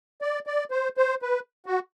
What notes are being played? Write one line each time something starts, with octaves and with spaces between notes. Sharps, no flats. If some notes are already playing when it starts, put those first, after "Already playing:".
D5
D5
C5
C5
B4
F#4